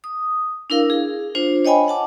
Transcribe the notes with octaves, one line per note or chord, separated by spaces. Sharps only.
D#6
D4 E4 A#4 F5
G#4
D4 F4 C5
C#5 D#5 G5 G#5 B5
F#5 A5 D6